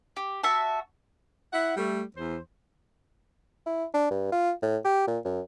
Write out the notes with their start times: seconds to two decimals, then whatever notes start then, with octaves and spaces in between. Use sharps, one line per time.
0.16 G4
0.44 F#4 E5 A5
1.53 E4 F#5
1.76 G3 A3
2.15 E2 C5
3.66 E4
3.94 D4
4.11 G2
4.32 F4
4.62 A2
4.85 G4
5.08 A#2
5.25 F#2